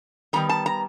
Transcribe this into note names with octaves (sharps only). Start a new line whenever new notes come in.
D#3 G3 B3 A#5
A5
A#5